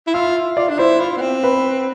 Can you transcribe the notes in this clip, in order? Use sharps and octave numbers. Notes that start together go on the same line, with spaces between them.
E4
F4 E5 E6
F4 D5 D6
D4
E4 C5 C6
F4
B3
C4
B4 B5